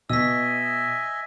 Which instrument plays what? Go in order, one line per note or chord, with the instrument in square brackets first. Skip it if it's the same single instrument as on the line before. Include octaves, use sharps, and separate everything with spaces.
[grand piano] B2 [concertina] D#5 E5 G#5 [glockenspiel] E6 B6